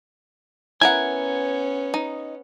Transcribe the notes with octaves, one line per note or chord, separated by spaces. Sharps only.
B3 C#4 E4 A#4 F#5 G#5
D#4